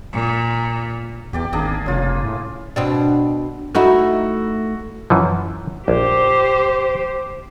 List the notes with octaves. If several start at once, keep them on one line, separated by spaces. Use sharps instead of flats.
A#2
E2 G4 D5 G5
G#1 A#3 D4 G#4
F1 C#3 F4
A2
B2 C4 D4
A3 D#4 E4 F#4
F#2 E3 F3
A#1 G4 C5